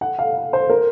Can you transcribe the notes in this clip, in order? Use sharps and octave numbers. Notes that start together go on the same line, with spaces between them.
F#5
F5
C5
A#4